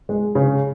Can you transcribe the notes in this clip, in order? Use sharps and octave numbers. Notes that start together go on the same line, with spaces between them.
G#3
C#3